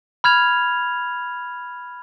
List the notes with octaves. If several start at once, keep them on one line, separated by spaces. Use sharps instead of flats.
B5 F6 G#6 F7